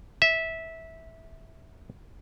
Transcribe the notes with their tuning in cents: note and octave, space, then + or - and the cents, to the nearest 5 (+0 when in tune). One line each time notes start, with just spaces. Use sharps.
E5 -15